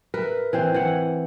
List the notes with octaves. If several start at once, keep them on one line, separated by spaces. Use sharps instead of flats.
A#4 B4 E5
E3 C4 C5
E3 F#5